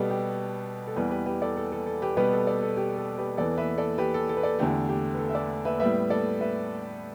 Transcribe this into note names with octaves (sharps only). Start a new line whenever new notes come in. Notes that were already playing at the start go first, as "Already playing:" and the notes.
Already playing: B2 G3 B3 G4 A4
G4
A4
E2 E3 G3 B3 G4 B4
G4 B4
G4 B4
A4 D5
A4
A4
A4
G4 B4
B2 G3 B3 G4 B4
A4
A4 D5
A4
G4
A4
G4 B4
E2 E3 B3 A4 D5
B4 E5
A4 D5
G4 B4
A4
A4
B4
A4 D5
E2 D3 A3 G4
G4
B4
A4
E5
A4 D5
B4 E5
A2 G3 B3 B4 E5
A4 D5
B4 E5